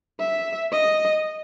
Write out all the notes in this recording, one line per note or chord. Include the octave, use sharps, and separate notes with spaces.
E5
D#5